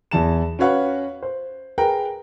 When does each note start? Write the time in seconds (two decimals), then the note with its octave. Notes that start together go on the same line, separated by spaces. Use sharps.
0.11 E2 E3 A5 E7
0.59 C#4 F#4 B4 C#5 F5 F#5
1.23 C5
1.78 G#4 A#4 B4 G5 A#5